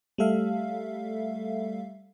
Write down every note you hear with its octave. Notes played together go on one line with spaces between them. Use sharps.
G3 A3 A4 E5 F5